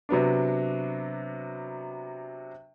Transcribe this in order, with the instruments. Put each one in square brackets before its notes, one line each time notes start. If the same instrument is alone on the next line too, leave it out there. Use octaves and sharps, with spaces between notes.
[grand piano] C3 F#3 B3 D4